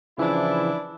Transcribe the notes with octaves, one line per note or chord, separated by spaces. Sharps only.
C#3 E3 F3 D4 E4